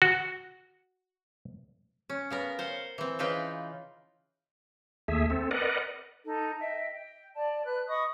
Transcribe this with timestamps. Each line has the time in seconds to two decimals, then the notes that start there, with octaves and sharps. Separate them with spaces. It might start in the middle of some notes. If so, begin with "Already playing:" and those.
0.02 F#4
2.09 C#4
2.30 C#3 B3 A#4
2.59 C5 F5 F#5
2.98 E3 C4
3.19 C#3 E3 D#4 F4 B4 G5
5.08 D#2 A3 G#4 E5
5.30 C4 A4
5.51 A#4 B4 D5 D#5 F#5
6.24 D#4 A4
6.58 D#5 E5 G5
6.94 G5
7.34 D5 A5
7.64 B4 F#6
7.87 D#5 B5 C#6 D#6